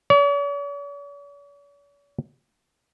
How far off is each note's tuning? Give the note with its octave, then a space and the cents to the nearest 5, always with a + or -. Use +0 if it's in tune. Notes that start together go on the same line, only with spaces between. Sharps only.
C#5 +45